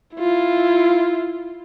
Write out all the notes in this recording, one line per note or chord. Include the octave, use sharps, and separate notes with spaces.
E4 F4